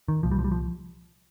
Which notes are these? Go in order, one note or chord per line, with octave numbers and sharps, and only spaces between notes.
D#3
C2 A#2 F3
G3
F3
G3
F3